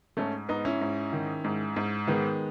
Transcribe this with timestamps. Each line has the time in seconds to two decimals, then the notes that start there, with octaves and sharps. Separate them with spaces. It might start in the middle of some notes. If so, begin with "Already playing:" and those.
0.17 G#2 A3 C#4
0.49 G#2 B3 D#4
0.65 C#4 E4
0.81 G#2
1.13 D#3
1.44 G#2
1.76 G#2
2.07 D#3 G#3 B3